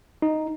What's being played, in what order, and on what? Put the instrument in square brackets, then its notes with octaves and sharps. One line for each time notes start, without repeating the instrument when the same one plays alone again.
[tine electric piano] D#4